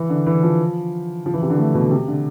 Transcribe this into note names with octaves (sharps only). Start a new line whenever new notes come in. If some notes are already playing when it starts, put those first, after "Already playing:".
Already playing: E3
D3
E3
F3
F3
E3
C3
D3
A3
B2
C3
D3